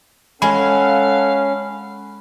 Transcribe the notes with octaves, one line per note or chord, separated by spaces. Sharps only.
G#3 C#4 A4 F5 F#5 B5